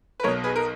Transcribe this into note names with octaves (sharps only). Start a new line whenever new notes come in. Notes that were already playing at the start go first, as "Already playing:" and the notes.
B4
B1 B2 A#4 C#5
G#4 B4
A#4